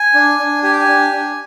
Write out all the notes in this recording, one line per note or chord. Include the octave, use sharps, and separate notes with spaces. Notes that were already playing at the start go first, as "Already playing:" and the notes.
Already playing: G#5
D4
D4
G4 G#5
G5
G#5
D4
D4